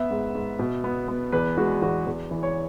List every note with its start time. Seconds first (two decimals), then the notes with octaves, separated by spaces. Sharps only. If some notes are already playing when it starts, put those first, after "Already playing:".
Already playing: B3 E5
0.10 G#2
0.35 G#2
0.59 B2
0.84 B3
1.08 B3
1.32 E2 B4
1.57 G#3 F#4
1.82 E2 F#4
2.06 E2
2.31 E3
2.43 C#5